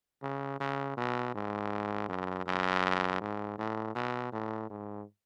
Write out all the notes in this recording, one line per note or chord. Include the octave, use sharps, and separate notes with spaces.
C#3
C#3
B2
G#2
F#2
F#2
G#2
A2
B2
A2
G#2